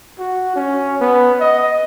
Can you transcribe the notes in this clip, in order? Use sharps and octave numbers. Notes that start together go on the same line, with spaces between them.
F#4
C#4
B3
D#5